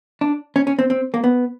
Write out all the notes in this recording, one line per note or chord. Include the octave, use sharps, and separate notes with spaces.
D4
C#4
C#4
C4
C4
A#3
B3